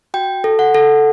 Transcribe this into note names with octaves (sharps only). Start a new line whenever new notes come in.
F#4 G5
A4
F#5
A4